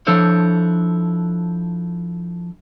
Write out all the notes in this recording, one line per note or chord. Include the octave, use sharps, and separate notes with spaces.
F3 D4 E4 A4 C5 C#5